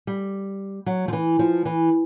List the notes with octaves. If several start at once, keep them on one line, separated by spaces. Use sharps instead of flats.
G3
F#3
F3
E3
F3
E3